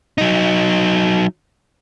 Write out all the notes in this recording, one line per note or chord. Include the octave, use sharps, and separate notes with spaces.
F#3 D#4